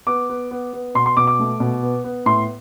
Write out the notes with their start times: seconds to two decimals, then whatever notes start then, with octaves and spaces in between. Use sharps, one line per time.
0.07 B3 D6
0.30 B3
0.51 B3
0.73 B3
0.95 B2 C6
1.06 C6
1.17 B2 D6
1.27 D6
1.39 A3
1.60 B2
1.83 B3
2.04 B3
2.26 A2 C6